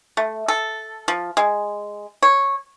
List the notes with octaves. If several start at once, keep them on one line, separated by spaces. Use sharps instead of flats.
A3
A4
F3
G#3
C#5